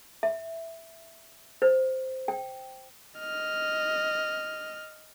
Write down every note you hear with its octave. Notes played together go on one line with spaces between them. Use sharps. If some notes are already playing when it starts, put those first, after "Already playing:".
E5
C5
G5
D#5 F6